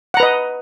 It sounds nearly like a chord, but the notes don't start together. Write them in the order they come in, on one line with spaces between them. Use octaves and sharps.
F#5 A#5 B4 D#5